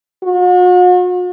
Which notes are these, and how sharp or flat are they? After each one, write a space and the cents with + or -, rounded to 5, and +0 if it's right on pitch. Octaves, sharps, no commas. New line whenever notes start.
F#4 -45